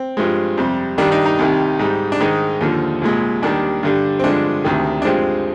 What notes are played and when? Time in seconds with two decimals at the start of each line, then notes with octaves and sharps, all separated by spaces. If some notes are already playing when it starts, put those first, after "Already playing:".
Already playing: C4
0.17 G2 F3 G#3
0.57 F2 C3 G3
0.98 G2 D#3 G3 D4
1.12 D#4
1.26 D#4
1.39 C2 C3 D#3 G3
1.79 G#2 G3
2.12 D4
2.20 G#2 D#3 G#3 D#4
2.61 D#2 D3 F3
3.01 C2 A#2 G#3
3.42 D#2 D#3 G3 D4
3.83 G2 D3 G3
4.19 C4
4.24 G2 D3 F3 G#3 D4
4.65 D2 C3 D#3
5.02 D4
5.05 G2 F3 G#3 C4